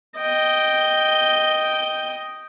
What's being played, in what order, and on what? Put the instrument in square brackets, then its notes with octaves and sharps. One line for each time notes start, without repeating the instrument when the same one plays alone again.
[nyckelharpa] D#5 G5